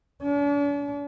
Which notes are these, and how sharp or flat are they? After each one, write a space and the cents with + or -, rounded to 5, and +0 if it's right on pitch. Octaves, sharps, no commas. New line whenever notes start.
D4 -45